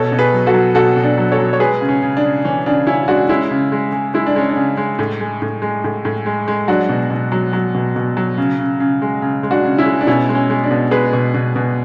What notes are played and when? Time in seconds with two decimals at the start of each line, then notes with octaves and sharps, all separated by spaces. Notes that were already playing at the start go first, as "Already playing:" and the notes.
Already playing: B2 A4 C#5
0.12 B2
0.19 G#4 B4
0.33 F#3
0.46 F#4 A4
0.54 F#3
0.75 B2 F#4 A4
0.97 B2
1.04 D4
1.18 F#3
1.32 A4 C#5
1.39 F#3
1.53 C#5
1.60 G#3 G#4 B4
1.81 C#3
1.88 C#4
2.02 C#3
2.17 D4
2.24 C#3
2.45 E3 C#4
2.66 C#3 D4
2.87 C#3 C#4 E4
3.08 G#3 D4 F#4
3.29 G#3 C#4 E4
3.51 C#3
3.72 G#3
3.92 G#3
4.14 G#3 E4
4.27 D4
4.36 G#3 C#4
4.49 D4
4.56 C#3
4.77 G#3
4.99 A2
5.21 G#3
5.42 A2
5.62 G#3
5.84 A2
6.05 A2
6.26 G#3
6.48 G#3
6.68 F#3 D4 F#4
6.89 B2
7.10 B2
7.32 F#3
7.53 F#3
7.74 B2
7.96 B2
8.17 F#3
8.37 C#3
8.59 C#3
8.80 C#3
9.02 G#3
9.22 C#3
9.43 G#3
9.51 D4 F#4
9.65 C#3
9.78 C#4 E4
9.85 G#3
10.01 D4
10.07 B2 C#4 E4
10.29 G#3
10.35 C#4
10.50 G#3
10.64 D4
10.71 B2
10.91 G#3 G#4 B4
11.13 B2
11.34 B2
11.56 B2